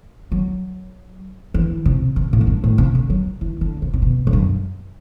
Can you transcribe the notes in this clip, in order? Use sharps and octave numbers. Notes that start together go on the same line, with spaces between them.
F#3
E3
C3
C3
A2
F#2
G2
A2
C3
D3
F#3
E3
D3
C3
C3
B2
G2
F#2